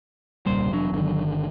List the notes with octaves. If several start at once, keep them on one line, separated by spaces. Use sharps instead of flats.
D#1 C2 A#2 C#3 G3 C5
F1 E2 F#3 D4
G1 D3 D#3